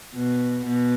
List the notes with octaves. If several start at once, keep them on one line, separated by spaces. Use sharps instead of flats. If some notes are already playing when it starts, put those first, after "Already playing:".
B2
B2